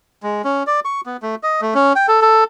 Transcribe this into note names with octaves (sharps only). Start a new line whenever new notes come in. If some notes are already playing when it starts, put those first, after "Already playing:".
G#3
C#4
D5
C#6
B3
A3
D#5
A3
C#4
G5
A4
A4